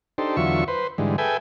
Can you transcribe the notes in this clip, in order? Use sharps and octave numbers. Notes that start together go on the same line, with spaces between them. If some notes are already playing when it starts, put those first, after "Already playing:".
D4 D#4 G4 A4 C5
E2 D3 F#3 F4 E5 C#6
B4 C5
G#2 D3 E3 G3 G#3
G#4 A4 B4 E5 G5 G#5